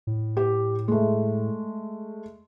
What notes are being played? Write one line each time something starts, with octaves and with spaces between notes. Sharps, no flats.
A2
G4
G#3 A3